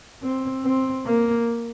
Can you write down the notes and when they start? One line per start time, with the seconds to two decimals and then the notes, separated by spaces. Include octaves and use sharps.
0.23 C4
0.64 C4
1.05 A#3